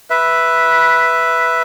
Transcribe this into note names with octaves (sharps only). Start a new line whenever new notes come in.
B4 E5